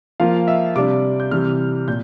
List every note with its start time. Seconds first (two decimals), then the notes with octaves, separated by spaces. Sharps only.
0.20 F3 A#3 F4 F5
0.48 E5
0.76 C3 G3 D4 D6
1.20 G6
1.31 C3 E3 G3 F6
1.88 A#2 G6